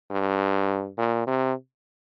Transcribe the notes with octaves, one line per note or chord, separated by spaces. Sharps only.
G2
A#2
C3